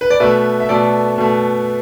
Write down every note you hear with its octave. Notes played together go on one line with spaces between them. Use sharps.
B4
D5
B2 A3 B4 E5
E5
B2 A3 A4 D5
B2 A3